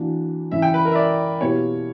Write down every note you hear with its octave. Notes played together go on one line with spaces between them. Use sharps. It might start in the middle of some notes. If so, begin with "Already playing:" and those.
Already playing: E3 A#3 D4 F#4
F#2 C#3 E3 E5
G5
B4
A#4
E5
D5
B2 A#3 E4 G4 B4 C#5